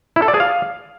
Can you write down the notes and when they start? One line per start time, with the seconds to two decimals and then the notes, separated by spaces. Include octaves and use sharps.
0.16 E4
0.22 A4
0.28 D5
0.34 G#4
0.40 F5